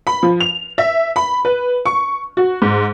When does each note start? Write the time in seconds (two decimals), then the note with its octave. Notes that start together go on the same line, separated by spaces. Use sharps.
0.07 B5
0.23 F3
0.40 F7
0.78 E5
1.16 B5
1.45 B4
1.86 C#6
2.37 F#4
2.62 G#2